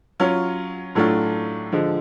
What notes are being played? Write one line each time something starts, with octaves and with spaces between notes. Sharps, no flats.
F#3 C#4 F4
A2 F#3 A3 D4 F4
D3 F3 G#3